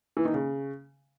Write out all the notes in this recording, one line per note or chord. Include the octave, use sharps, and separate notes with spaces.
E3
D#3
C#3